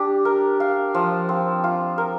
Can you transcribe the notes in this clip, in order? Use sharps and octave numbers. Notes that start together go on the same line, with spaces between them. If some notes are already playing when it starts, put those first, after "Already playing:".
Already playing: D4 G4
A#4
F5
F3
C4
F4
A#4